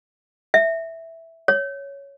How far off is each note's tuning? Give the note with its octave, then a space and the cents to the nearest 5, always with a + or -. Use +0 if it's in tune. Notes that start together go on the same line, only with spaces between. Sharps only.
E5 -5
C#5 +5